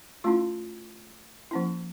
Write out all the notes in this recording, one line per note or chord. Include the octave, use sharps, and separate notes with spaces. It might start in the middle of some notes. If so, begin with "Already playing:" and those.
A3 C#4 E4 F4
F3 A#3 C#4 E4